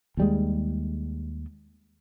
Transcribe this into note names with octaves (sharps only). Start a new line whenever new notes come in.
D#2 G3 G#3